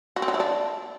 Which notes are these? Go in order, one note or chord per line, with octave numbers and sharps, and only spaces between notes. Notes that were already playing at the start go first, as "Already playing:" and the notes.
F#4
C4
F#3
E4
D4